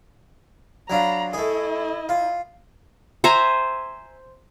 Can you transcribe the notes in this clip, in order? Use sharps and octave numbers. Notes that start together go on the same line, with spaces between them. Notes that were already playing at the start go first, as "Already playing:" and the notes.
F#3 D4 F4 A#5 B5
A3 E4 G#4 D#5
F4
C5 E5 G#5 A#5